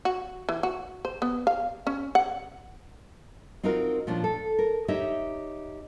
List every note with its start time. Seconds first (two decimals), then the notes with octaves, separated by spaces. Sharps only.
0.05 F#4
0.49 E3
0.63 F#4
1.05 C5
1.22 B3
1.47 F5
1.87 C#4
2.15 F#5
3.63 C4 D#4 F4 F#4 A#4
4.07 A#2 F3 C#4 D4
4.24 A4
4.59 A#4
4.88 D#4 G4 C#5 D#5 E5